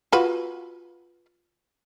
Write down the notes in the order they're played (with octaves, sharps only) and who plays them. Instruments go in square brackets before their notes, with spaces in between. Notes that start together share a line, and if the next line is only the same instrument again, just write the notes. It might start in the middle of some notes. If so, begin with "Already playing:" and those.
[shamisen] F4 F#4 B4